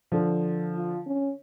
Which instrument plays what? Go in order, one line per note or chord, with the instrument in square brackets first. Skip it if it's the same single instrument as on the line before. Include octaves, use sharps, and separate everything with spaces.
[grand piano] D3 F3
[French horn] F4
C#4